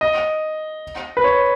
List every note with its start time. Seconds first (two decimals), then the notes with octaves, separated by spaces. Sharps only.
0.01 D#5
1.17 B4
1.24 C#5